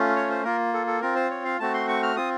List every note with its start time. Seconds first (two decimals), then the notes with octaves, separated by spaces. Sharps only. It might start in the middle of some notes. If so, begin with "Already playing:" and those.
Already playing: A3 C#4 F4
0.16 C#5
0.30 C5
0.44 A#3 F4 A#4
0.74 A4
0.87 A4
1.01 C4 F4 A#4
1.16 C5
1.31 C#5
1.45 F5
1.60 A3 C4 F#4 A5
1.74 C6
1.89 C#6
2.03 F6
2.17 C4 F4 D#6